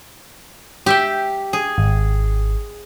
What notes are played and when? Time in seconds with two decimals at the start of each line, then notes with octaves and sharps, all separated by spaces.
0.86 G4 E5 G5
1.53 G#4
1.78 G#1